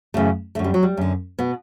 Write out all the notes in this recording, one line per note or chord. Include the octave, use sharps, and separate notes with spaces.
F#2 C#3 E3 A3
F#2 D3 A3
G3
F#3
G3
F#2 D3
B2 B3